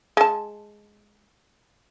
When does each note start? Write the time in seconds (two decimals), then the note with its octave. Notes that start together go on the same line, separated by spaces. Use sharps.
0.17 G#3 A5